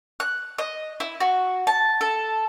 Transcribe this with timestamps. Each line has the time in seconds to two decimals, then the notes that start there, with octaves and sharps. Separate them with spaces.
0.20 F#6
0.58 D#5
1.00 E4
1.20 F#4
1.67 A5
2.01 A4